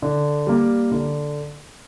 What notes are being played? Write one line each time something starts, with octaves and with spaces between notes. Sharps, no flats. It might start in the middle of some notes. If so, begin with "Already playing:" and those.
D3
G3 A#3
D3